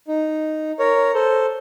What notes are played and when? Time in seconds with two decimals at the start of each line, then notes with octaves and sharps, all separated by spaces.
0.08 D#4
0.79 A#4 C#5
1.14 A4 C5